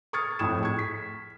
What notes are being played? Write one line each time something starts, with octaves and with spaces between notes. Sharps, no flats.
C#6 D#6 F6 G#6 A6 C#7
F2 A2 D#6 G#6 E7
G#4 C#6 G#6
B6